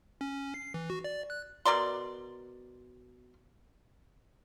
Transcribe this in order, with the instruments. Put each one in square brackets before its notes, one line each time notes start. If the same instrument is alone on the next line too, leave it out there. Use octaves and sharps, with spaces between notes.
[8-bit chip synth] C#4
C7
E3
F#4
D5
F#6
[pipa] B2 A#4 D5 C6